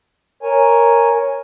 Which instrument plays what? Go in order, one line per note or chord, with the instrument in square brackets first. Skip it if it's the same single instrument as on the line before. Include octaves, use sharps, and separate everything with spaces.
[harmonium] A#4 C#5 G#5